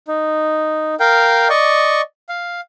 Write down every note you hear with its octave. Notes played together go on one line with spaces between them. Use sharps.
D#4
A#4 F5 G5
D5 D#5 C#6
F5